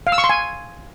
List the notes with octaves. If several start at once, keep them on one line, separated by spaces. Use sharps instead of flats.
F5
E6
C#6
C6
G#5